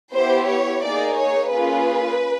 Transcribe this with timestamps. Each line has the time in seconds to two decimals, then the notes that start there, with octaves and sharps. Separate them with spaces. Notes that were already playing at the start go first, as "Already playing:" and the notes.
0.13 B3 E4 G4 C5
0.48 C#5
0.83 A#3 D#4 G#4 D5
1.18 C#5
1.52 A#3 C#4 F4 G#4 B4